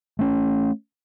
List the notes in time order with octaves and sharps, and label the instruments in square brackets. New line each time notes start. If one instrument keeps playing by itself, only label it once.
[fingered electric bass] A3 C#4